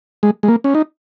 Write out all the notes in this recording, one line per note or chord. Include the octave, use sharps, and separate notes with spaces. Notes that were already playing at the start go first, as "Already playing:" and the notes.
G#3
G#3
A#3
C#4
D#4